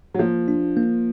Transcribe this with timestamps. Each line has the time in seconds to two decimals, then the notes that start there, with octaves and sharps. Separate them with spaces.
0.14 F#3
0.19 F3 A#3
0.48 D4
0.77 A#3